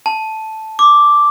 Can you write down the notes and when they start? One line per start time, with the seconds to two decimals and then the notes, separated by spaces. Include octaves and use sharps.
0.06 A5
0.79 D6